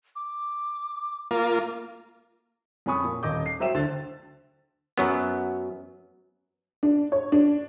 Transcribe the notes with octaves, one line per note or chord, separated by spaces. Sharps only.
D6
A#3 F4
F2 C#4 G#5 B5 C#6 D#6
A#2
D#1 D#5 D6 G6
C7
F#3 C5 E5 G5 E7
D2 D3 C5 A6
F#2 F#3 B3
D4
C#5
D4